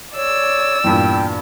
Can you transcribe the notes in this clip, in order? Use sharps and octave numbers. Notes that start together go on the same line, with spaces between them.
C#5 D5 E6
E2 G2 A#2 G5